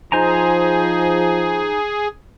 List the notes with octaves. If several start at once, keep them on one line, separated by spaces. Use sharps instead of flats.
F3 D#4 G#4 C5 G#5 A#5